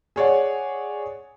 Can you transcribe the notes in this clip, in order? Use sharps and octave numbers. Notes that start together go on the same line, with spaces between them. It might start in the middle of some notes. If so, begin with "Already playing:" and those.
G#4 C#5 D5 F#5